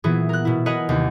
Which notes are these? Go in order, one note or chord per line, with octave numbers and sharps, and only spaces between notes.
A#2 E3 B3 E4 G#4
A#4 F#6
B2 E4
A#4 B4 D#5 F#5 G#5
D#2 C3